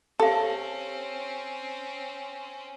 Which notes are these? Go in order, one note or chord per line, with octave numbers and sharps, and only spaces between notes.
C4 C#4 G4 A4 F5